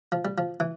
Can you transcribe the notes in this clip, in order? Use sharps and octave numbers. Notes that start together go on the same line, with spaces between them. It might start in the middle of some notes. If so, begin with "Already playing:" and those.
F3
G3
F3
E3